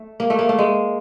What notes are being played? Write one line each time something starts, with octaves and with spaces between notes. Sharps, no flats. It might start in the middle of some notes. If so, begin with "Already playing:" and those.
Already playing: A3
A#3
A3
A#3
A3
G#3